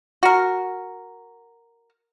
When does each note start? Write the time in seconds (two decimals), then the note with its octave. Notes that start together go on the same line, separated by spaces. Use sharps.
0.23 F#4 A#4